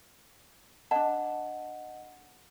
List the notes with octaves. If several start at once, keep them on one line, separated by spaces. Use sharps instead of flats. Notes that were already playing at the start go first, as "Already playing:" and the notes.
D4 D#5 F#5 A5